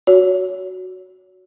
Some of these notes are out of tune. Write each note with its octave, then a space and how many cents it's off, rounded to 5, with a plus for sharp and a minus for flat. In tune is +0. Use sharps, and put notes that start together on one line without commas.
F#4 +0 C#5 +25